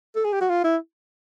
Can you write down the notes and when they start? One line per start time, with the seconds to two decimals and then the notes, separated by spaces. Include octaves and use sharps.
0.16 A4
0.25 G#4
0.33 G4
0.41 F#4
0.50 F4
0.64 E4